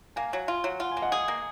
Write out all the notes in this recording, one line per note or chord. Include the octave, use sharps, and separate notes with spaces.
A#3 F5 G#5
F#3
F4
F#3
F4 F#5
G#5
A#3
D#5 F#5
G#4
A#3